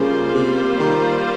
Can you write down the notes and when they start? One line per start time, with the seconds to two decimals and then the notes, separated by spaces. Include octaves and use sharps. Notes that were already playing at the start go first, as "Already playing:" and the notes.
Already playing: C#3 G3 A#3 F4 C5
0.34 C3
0.79 D#3